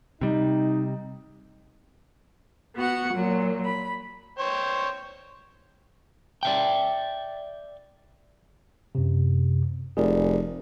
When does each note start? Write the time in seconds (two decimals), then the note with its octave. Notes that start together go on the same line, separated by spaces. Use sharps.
0.21 C3 G3 D#4
2.77 B3 F#4 F#5
3.13 A#2 F#3
3.65 B5
4.39 C5 C#5 G5
6.43 D5 E5 G5
8.95 F#2 C3
9.97 F1 G#4 A#4 D5